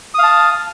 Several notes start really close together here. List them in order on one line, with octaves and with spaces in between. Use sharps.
D#6 F5 A5